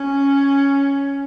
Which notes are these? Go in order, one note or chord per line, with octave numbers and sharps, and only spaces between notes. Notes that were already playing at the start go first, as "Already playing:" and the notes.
Already playing: C#4